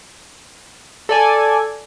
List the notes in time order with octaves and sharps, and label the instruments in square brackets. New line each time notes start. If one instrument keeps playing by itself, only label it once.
[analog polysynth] A4 D5 G#5